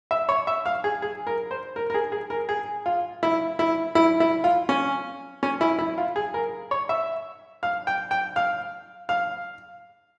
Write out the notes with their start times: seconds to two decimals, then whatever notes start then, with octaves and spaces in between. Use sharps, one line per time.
0.11 E5
0.29 C#5
0.47 E5
0.66 F5
0.84 G#4
1.02 G#4
1.27 A#4
1.51 C5
1.76 A#4
1.90 A#4
1.94 G#4
2.12 G#4
2.30 A#4
2.49 G#4
2.86 F4
3.23 E4
3.59 E4
3.95 E4
4.20 E4
4.44 F4
4.69 C#4
5.43 C#4
5.61 E4
5.79 E4
5.98 F4
6.16 G#4
6.34 A#4
6.71 C#5
6.89 E5
7.63 F5
7.87 G5
8.11 G5
8.36 F5
9.09 F5